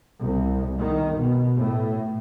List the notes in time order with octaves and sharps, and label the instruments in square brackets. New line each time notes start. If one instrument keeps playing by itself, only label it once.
[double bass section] C2
D#3
B2
A2